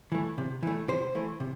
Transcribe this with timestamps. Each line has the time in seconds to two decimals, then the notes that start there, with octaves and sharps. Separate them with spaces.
0.12 E3 A3
0.38 C3
0.63 E3 A3
0.88 C3 C5
1.15 E3 A3
1.40 C3